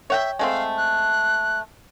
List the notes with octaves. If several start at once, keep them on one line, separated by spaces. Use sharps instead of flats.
C#5 E5 F#5 G5
G#3 A3 C4 F5
F#6